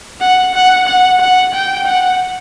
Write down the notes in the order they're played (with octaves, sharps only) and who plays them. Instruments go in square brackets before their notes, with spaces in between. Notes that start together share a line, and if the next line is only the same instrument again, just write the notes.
[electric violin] F#5
F#5
F#5
F#5
G5
F#5